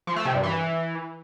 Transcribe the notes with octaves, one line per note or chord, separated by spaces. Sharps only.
F3
A3
C3
G2
E3